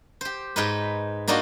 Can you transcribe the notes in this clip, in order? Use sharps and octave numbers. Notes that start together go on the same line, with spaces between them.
G4 C5
G#2 D#4 B4
A#3 D4 D#4 F4 F#4